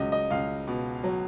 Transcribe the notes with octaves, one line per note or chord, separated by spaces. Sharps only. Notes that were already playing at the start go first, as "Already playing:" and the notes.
Already playing: C#2 F#3 D#5
D#5
C#2 F5
B2
F#3